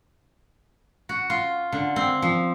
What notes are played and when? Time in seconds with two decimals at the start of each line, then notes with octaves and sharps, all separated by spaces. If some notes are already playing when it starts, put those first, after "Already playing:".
1.09 F#4
1.30 F4
1.72 D3
1.96 C4
2.22 F3